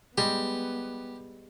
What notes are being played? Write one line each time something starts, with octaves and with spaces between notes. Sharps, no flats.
G3 G#3 B3 G4